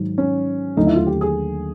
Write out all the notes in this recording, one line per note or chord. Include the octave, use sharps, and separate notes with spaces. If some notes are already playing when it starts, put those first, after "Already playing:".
Already playing: G#2 D#3 F#3
C#4
D#2 D3 F#3 A3 D#4
E4
F4
G4
G#4